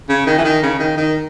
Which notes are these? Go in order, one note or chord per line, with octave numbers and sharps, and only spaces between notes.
C#3
D#3
E3
D#3
C#3
D#3
D#3